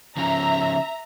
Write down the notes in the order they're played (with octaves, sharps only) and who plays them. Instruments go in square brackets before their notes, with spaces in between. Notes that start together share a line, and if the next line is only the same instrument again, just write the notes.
[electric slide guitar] C#3 F3 C#4 [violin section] E5 A#5